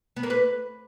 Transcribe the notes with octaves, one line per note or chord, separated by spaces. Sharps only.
B3
A#3
B4